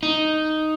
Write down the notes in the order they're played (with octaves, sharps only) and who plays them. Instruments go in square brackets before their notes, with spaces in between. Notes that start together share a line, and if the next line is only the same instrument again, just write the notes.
[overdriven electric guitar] D#4